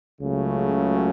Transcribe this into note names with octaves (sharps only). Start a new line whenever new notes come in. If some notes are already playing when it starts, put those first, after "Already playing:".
C#2 C#3 F#3 A3